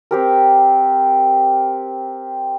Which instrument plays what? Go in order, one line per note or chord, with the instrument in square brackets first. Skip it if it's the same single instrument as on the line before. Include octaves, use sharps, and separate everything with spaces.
[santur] C4 G4 A#4